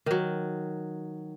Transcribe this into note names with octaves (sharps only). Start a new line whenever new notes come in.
D#3 F#3